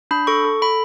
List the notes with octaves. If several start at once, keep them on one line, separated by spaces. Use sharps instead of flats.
D4 B5
A4 C#6
A4
A4 B5